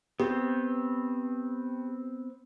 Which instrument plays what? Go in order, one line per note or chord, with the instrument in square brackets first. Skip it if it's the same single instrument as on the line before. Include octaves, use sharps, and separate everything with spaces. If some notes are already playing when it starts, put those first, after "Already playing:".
[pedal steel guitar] B3 C4 [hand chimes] G4